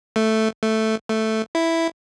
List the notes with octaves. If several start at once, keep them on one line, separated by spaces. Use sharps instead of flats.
A3
A3
A3
E4